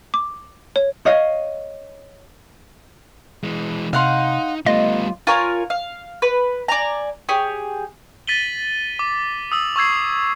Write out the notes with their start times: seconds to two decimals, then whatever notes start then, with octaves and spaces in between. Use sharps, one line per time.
0.14 D6
0.76 C#5
1.05 C#5 D#5 F5
3.44 E3 G#3
3.93 C3 D#4 F5 F#5 C6
4.66 G3 A3 B3 F4 D#5
5.27 F4 A#4 C#5 G#5
5.70 F5
6.22 B4
6.68 D5 G#5 A#5
7.29 G4 G#4 C#5
8.27 A6 B6 D#7 F#7 G7
8.99 D6
9.52 D#6 E6 F#7
9.76 C#6 D6 E6 G#6 C7